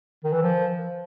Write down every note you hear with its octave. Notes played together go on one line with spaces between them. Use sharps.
D#3
E3
F3